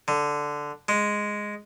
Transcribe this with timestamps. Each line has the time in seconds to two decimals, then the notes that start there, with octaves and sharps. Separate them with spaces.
0.08 D3
0.88 G#3